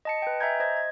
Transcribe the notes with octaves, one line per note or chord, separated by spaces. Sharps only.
D#5 A5 C#7
B4 G5
D#5 E5 G#5 A#5 G6 G#6
C5 D#5 G#6
G#6